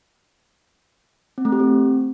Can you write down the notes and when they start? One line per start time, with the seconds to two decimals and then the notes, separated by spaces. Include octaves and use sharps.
1.38 C4
1.45 A3
1.52 G4
1.60 C4